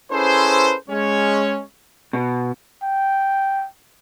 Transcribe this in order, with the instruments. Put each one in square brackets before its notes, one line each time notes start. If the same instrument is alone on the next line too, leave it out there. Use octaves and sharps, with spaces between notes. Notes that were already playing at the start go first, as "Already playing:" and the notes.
[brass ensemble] C#4 E4 G#4 A4 B4 C5
G#3 C#4 C#5
[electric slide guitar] B2
[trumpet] G5